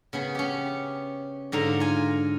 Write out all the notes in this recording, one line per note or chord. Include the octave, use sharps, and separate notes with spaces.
C#3 B3 G#4
C#4 G4
G#2 D3 F5 A#5
F4 G#5